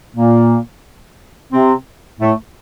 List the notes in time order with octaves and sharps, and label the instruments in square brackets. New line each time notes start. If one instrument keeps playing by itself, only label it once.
[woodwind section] A#2 A#3
C3 C4
A2 A3